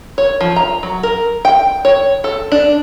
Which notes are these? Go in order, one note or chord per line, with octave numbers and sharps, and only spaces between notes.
C#5
F3
A#5
F#3
A#4
G5
C#5
A4
D4